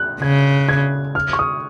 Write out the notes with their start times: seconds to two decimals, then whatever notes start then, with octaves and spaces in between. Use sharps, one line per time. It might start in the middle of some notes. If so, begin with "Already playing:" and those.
Already playing: F#6
0.21 C#3 G#6
0.69 G#6
1.15 F6
1.33 C#6
1.39 D#6